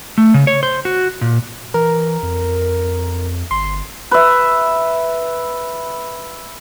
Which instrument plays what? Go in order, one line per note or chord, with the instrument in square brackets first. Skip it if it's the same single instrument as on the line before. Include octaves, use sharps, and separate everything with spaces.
[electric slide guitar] A3
C#3
C#5
C5
F#4
A#2
[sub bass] E3 [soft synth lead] A#4
[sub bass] F2
[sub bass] G1 [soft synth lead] C6
[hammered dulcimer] B4 E5